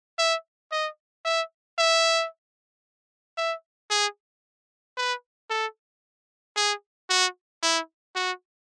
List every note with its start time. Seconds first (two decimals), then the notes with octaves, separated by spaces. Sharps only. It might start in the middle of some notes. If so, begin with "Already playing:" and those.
0.18 E5
0.72 D#5
1.25 E5
1.78 E5
3.37 E5
3.90 G#4
4.97 B4
5.50 A4
6.56 G#4
7.10 F#4
7.63 E4
8.15 F#4